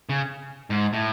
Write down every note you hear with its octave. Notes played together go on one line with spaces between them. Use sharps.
C#3
G#2
A2